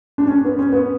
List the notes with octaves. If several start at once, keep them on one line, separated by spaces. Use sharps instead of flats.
D4
C#4
B3
C#4
B3